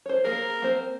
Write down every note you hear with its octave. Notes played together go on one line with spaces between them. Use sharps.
C5 C#5
A#3 G#4 A#4
A#3 C4 C5